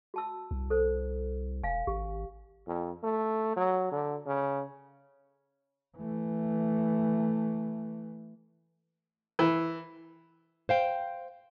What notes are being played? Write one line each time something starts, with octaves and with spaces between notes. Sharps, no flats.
F#4 A5 E6
C2
A4 C5
E1 F5 G#5
G#1 G4
F2
A3
F#3
D3
C#3
E3 A3
E3
C5 F5 G5